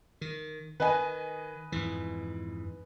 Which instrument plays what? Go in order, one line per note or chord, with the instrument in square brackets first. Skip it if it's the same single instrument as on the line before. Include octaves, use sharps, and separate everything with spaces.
[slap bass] D#3
[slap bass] D#3 [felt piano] B4 D#5 G#5
[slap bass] F2 G#2 E3